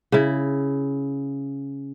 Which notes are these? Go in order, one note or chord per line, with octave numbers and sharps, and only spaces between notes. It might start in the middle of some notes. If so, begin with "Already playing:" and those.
C#3 E4